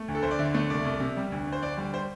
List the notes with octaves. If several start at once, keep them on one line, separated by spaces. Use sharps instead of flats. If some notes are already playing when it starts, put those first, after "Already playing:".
Already playing: A3
D2
A4
D2 C5
D5
D3 E5
A3
C2 D5
C2
C3
G3
D2
D2
C5
D3 D5
G3
C5